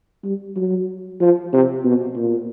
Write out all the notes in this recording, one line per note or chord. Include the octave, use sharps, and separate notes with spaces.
G3
F#3
F3
C3
B2
A#2